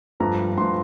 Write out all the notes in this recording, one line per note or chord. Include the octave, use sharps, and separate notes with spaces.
G2 F3 A3 A#5
G2 F3 A3 C6